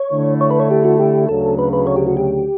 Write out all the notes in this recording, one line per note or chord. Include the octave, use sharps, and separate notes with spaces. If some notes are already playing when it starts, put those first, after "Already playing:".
Already playing: C#5
D3 A3 E4
C#5
B4
C#5
G4
F#4
G4
D2 C#3 F#3 A4
B4
B4
C#5
G4
F#4
G4